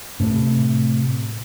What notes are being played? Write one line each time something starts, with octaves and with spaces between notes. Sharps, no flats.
A2 C3